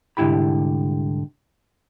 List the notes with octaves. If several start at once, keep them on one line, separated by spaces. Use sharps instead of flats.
C2 G#2 D3 E4 G4 B5